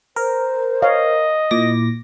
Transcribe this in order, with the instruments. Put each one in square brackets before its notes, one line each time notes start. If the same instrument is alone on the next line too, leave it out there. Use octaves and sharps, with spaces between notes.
[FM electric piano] A#4 [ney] C5
[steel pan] C#5 F5 [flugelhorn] D#5
[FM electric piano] A#2 D6 A#6 [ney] E4